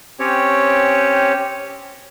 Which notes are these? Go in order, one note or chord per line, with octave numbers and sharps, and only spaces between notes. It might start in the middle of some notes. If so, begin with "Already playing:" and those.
C4 C#4 G4 C#5